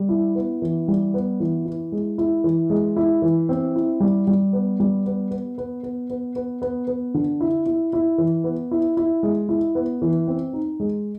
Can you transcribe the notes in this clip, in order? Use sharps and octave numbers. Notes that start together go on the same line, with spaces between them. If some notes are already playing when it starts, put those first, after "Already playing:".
Already playing: G3
E4
B3
E3
G3
B3
E3
E4
G#3
E4
E3
G#3
E4
E3
C4
E4
G3
G3
B3
G3
B3
B3
B3
B3
B3
B3
B3
B3
D3
E4
E4
E4
E3
B3
E4
E4
G#3
E4
B3
E3
C4
D#4
G#3